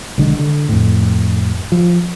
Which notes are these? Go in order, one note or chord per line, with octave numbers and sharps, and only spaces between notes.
B1 D3 G#3
D3
F2 A2
F3